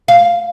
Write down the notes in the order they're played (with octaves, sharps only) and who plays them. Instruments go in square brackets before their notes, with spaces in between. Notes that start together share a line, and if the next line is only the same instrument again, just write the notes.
[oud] F5